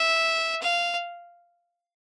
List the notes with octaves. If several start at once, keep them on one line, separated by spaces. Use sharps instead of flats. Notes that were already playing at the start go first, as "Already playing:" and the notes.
Already playing: E5
F5